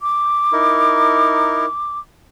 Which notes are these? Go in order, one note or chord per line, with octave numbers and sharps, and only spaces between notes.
D6
D#4 E4 A#4